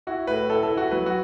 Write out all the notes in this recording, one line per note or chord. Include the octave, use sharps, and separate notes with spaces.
E4 F#4
A2 B4
E4 A4
A4
E4
F#4
F#3 B4
F#4